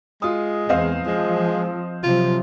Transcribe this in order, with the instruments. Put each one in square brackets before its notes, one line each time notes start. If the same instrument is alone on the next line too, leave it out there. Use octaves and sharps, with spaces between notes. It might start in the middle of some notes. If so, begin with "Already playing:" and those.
[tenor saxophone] G#3 [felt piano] F4 D#6
[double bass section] E2 [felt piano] C4 D#5 F5
[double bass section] F3 [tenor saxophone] G#3
[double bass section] C3 F3 F#3 [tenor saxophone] F4